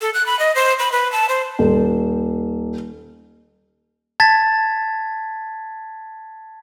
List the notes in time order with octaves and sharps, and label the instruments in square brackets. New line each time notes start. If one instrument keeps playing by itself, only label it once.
[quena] A4
F#6
B5
D#5
C5
B5
B4
A5
C5
[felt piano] D#1
[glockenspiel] A5 G#6 A6 B6